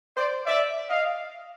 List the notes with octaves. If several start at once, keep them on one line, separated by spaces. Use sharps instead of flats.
C5 D5
D5 E5
D#5 F5